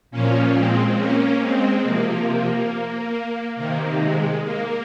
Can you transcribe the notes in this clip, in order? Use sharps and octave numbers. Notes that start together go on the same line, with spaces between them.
A#2 F3 A#3 C#4
G#3 C4
A#3 C#4
G#3 C4
C3 F3 A#3
A#3
C3 D#3 A#3
G#3
A#3